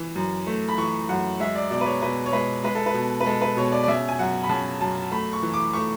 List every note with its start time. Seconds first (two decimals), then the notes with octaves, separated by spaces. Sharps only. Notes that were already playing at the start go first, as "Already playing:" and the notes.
Already playing: E3
0.15 F#2
0.47 A3
0.69 B5
0.78 E3 C#6
1.09 F#2 F#5
1.40 G#3 E5
1.56 D5
1.71 B2 D5
1.81 B4
1.86 C#5
2.02 B2 B4
2.26 C#5
2.33 G#3 B4
2.64 G#3 B4
2.75 A4
2.86 B4
2.94 B2
3.20 B4
3.26 G#3 A4
3.42 B4
3.57 B2 C#5
3.72 D5
3.84 D5
3.88 C#3 E5
4.09 G#5
4.19 F#2 F#5
4.43 B5
4.49 C#3 A5
4.81 F#2 A5
5.12 A3 B5
5.33 C#6
5.43 E3
5.53 D6
5.73 A3 C#6